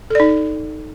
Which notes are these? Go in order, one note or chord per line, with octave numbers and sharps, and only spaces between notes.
D#4 A4 D5